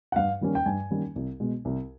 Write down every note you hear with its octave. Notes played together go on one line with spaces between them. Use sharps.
F#5
G2 F5
D#3 G3 A#3 C#4
G5
G2 G#5
D#3 G3 A#3 C#4
C2
B2 G#3
C2